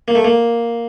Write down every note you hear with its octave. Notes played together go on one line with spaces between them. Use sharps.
A#3
A3
A#3